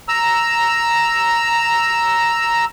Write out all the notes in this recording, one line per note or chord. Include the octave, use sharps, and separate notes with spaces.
A#5 E6